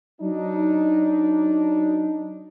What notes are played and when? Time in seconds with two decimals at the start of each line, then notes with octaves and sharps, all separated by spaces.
0.21 F#3 D4 D#4